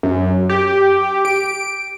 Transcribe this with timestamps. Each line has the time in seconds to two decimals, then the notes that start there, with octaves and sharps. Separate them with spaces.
0.03 F#2
0.49 G4
1.25 D7